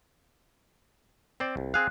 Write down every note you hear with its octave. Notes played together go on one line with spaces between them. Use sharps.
C4 C5 D5
C2
C4 G#4 F5 F#6